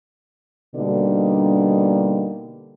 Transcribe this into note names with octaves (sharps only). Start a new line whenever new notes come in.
B2 D3 G3 A#3 D4 D#4